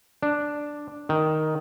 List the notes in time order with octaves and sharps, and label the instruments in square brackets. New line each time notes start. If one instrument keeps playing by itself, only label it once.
[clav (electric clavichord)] D4
D#3